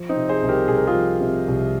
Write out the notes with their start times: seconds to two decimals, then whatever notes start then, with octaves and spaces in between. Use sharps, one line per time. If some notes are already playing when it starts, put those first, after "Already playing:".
Already playing: F3
0.09 C4 D#4
0.15 C3
0.29 G#4 C5
0.42 C2
0.48 G4 A#4
0.68 C2 G#4
0.77 A#4
0.87 F4 G#4
0.95 F3
1.21 C3
1.48 C2